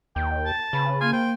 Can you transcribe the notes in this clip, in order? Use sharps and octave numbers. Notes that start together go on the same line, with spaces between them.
D#2 G5
A5
C#3 B4
A#3 F4 G#5
C5 G5